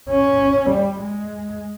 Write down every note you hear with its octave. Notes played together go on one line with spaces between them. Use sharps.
C#4
G3
G#3